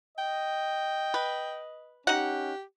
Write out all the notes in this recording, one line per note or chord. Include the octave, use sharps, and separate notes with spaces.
D#5 G5
B4
C#4 D#4 G4 F#5